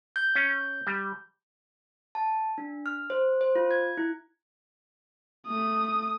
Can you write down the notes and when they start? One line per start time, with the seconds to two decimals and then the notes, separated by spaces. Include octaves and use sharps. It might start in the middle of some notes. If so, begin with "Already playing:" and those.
0.16 G6
0.35 C#4
0.87 G3
2.15 A5
2.58 D4
2.86 F6
3.10 C5
3.41 C5
3.55 F4
3.71 G#6
3.97 E4
5.47 A3 D#6